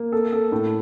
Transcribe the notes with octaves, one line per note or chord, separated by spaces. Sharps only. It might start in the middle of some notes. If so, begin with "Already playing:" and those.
Already playing: A#3
A4
A4
A2